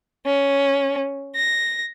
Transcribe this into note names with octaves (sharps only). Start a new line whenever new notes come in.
C#4
A#6